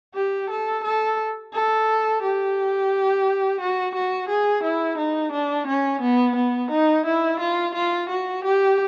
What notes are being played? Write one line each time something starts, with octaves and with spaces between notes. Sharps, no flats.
G4
A4
A4
A4
G4
F#4
F#4
G#4
E4
D#4
D4
C#4
B3
B3
D#4
E4
F4
F4
F#4
G4